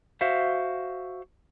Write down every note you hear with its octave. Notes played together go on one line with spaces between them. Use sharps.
F#4 C5 E5 F5